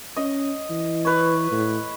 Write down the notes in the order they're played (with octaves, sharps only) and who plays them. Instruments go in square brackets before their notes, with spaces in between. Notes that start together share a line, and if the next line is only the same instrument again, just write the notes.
[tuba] C#4 [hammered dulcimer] D#5
[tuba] E3
[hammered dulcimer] B4 C#5
[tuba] A2